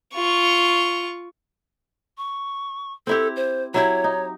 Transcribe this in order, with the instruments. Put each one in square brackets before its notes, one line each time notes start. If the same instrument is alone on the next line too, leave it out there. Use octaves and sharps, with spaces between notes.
[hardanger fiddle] F4 C#6
[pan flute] C#6
[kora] C4 E4 G4 [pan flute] A4
[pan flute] C5
[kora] F#3 E4 G4 [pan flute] C#5
[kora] D#4